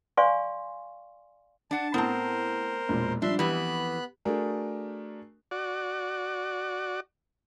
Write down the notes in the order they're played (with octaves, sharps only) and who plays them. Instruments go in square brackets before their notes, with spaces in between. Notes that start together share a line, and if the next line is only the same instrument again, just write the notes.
[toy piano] D5 F5 G#5 C6 C#6
[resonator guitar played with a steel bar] D4 F#5 [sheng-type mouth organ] A5
[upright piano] A2 A5 [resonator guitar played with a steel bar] B3 C4 [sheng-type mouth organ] A#4 C5
[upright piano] E1 A#2
[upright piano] F3 G3 [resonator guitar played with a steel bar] D4 [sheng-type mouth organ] E5 C6
[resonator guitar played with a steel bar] F2 E3 [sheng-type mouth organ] B3 B5 F#6 [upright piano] G4
[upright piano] A3 D4 F#4 G#4 A#4
[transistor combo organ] F#4 D5